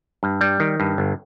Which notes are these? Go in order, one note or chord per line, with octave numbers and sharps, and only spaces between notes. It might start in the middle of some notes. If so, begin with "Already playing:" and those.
G2
G3
D#3
G2
G1